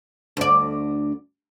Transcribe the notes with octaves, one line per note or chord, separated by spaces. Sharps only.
D2 D5